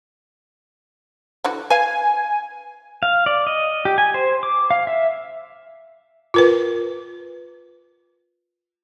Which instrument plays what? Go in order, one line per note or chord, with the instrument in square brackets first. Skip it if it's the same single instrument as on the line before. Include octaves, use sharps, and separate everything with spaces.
[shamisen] D3 E3 F#4
[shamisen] B4 F5 [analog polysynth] G#5
[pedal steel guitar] F5
D5
D#5
G4
G#5
C5
D6
F5
E5
[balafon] F4 A#4 B4